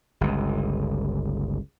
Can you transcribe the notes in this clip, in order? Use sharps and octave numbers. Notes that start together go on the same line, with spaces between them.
G1 C#2